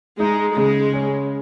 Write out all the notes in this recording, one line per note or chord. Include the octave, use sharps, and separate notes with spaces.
G#3 D#4
C#3 G#3
C#4